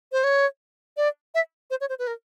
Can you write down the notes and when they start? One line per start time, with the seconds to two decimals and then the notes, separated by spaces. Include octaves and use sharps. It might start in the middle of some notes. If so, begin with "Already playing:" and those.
0.12 C5
0.24 C#5
0.97 D5
1.35 E5
1.70 C5
1.81 C#5
1.89 C5
1.99 B4
2.07 A#4